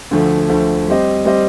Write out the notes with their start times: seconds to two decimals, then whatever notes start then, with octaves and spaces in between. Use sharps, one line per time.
0.11 D2 D3 F3 A3
0.49 D2 D3 F3 A3
0.88 G3 C4 G4 C5 D#5
1.25 G3 C4 G4 C5 D#5